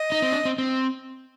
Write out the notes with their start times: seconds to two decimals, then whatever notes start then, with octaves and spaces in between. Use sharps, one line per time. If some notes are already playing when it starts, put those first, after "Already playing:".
Already playing: D#5
0.12 D#4
0.22 C4
0.32 D4
0.45 C4
0.58 C4